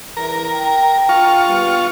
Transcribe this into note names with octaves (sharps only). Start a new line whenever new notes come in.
E2 A#4
G5
F4 C#6
G3 B3